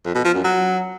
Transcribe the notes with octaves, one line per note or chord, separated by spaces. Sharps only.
F2
B2
F3
F#2
F#3